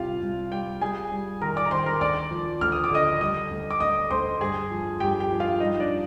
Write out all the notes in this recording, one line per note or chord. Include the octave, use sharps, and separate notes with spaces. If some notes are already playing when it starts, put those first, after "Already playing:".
Already playing: C2 G3 F4 G4 F5
C2
G3 G4 G5
G3 G#4 G#5
G3
D#3 A#4 A#5
D5 D6
A#5
D#3 C5 C6
A#4 A#5
D2 D5 D6
F3
D2 F6
D#6
D6
D3 D#5 D#6
G3 D#5 D#6
D2
D6
D2 D#5 D#6
D2 C5 C6
G2 G#4 G#5
F3
G2 G4 G5
G4 G5
F3
F4 F5
G3 D#4 D#5
D4 D5